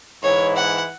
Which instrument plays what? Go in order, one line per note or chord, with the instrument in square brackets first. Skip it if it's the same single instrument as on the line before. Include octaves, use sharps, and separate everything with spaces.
[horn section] G#2 E3 G#3 E4 [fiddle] C#5
[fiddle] F#5